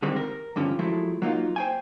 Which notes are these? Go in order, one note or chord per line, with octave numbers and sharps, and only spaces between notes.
D3 D#3 G3 G#3 C4
A#4
E2 G2 D3 F3 C#4
F3 F#3 G#3 A3 E4
F#3 A#3 D#4 F4
C5 G5 G#5